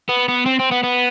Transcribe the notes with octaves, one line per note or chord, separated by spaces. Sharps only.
B3
B3
C4
C4
B3
B3